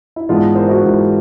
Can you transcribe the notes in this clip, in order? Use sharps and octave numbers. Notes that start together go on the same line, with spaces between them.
E4
G#2 E3 G#3 B3 D4 F4
A#4 C5
E4 F#4
G#2 E3 G#3 B3 D4